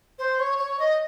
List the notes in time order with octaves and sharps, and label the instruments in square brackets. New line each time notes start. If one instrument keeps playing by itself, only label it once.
[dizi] C5
C#5
C#5
D#5